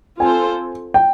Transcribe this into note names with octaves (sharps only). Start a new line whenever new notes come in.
C4 F4 A4 C5 G#5
G5